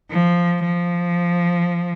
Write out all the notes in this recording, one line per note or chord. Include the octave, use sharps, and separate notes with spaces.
F3
F3